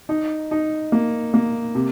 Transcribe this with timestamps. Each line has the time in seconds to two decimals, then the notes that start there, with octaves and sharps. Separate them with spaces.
0.09 D#4
0.51 D#4
0.92 A#3
1.34 A#3
1.75 C3